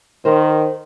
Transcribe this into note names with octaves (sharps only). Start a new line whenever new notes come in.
D#3 A#4 C5